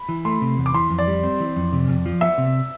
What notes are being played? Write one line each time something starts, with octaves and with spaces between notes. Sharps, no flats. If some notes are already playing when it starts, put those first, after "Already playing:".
Already playing: B5
E3
A3 C6
C3
E2
D6
E3 C6
F2
D5
G3
C4
E3
F2
C3
F2
F3
B3 E5
C3